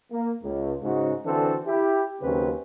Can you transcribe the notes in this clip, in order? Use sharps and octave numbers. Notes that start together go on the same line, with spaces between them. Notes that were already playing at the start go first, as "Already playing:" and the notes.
A#3
C#2
G#2 C#3 F#4
D3 E3 C4 D4 F#4 A4
E4 G4
D#2 C#3 F#3 C4 C#4 B4